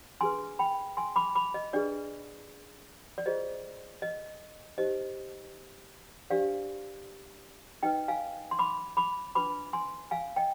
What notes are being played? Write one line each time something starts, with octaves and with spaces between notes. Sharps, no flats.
D4 G#4 B4 G#5 C6
G5 B5
G#5 C6
B5 D6
B5 D6
D#5
D4 G#4 B4 D5
D5
F4 G#4 C5 D#5
D#5
D#4 G4 C5 D#5
D4 G4 C5 D5 F5
D#4 B4 D#5 G5
F5 G#5
C6
B5 D6
B5 D6
D4 F4 B4 B5 D6
G#5 C6
F5 G#5
D#5 G5